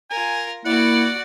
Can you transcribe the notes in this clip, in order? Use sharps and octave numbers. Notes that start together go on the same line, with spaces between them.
F4 A#4 G#5
A#3 E4 F#4 D5 F#5